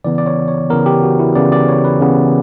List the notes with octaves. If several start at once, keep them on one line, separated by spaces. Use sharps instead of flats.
C#3 E3 B3 D5
D5
C#5
C#5
C#3 E3 B3 A#4
G4
F#4
E4
C#3 E3 B3 D5
D5
C#5
B4
C#3 E3 B3